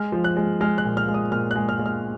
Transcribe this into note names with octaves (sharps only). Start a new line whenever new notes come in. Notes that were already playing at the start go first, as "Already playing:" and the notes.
Already playing: G#3 F6
F3
F#6
G#3
G#3 F6
F#6
A#2
F6
G#3
D#6
A#2 F6
F#6
G#3
F6
G#3
F6